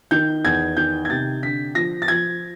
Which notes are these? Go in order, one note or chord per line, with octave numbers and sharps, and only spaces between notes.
D#3 G6
E2 G#6
D#3 G6
G#6
C3 A6
D3 B6
F3 A#6
A6
F3 G#6